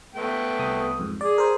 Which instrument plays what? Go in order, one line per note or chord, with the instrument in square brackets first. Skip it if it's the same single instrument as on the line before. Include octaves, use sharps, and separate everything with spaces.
[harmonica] A3 B3 G5
[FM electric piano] C2 D#6
F2 G#2
[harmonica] G#4 [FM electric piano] D5
[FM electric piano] A#4 C5